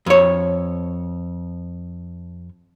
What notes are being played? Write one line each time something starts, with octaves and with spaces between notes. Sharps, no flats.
F2 C#5